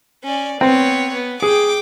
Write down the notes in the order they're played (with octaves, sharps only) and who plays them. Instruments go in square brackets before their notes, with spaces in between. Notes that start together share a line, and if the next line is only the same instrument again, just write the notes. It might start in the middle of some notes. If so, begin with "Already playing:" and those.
[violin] C#4 D5
[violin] B3 C#5 [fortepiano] C4
[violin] B3
[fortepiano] G#4 [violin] G5 D6